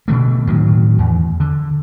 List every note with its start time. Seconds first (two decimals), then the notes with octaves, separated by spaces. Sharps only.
0.08 B2 D3 A3
0.47 A2 D#3 F#3
0.99 E2
1.40 D3